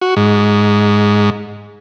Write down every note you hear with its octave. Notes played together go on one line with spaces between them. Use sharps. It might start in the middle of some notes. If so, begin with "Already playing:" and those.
F#4
G#2